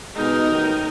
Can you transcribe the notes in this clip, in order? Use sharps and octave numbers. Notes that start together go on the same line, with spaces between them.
B2 G#3 D#4 A#4
A1 D#3